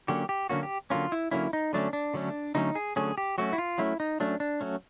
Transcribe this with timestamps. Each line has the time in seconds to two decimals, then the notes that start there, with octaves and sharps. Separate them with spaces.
0.08 D3 F#3 A#3 C#4 G4
0.29 G4
0.49 D3 F#3 A#3 C#4 F#4
0.63 G4
0.90 D3 F#3 A#3 C#4 F4
1.12 E4
1.31 D3 F#3 A#3 C#4 E4
1.53 D#4
1.73 D3 F#3 A3 C#4 D4
1.93 D4
2.14 D3 F#3 A3 C#4
2.55 D3 F#3 A3 C#4 D#4
2.75 G#4
2.96 D3 F#3 A3 C#4 G#4
3.18 G4
3.38 F#3 A3 C#4 F#4
3.53 E4
3.58 F4
3.78 F#3 A3 C#4 E4
4.00 D#4
4.20 F#3 A3 C#4 D4
4.40 D4
4.61 F#3 A3 C#4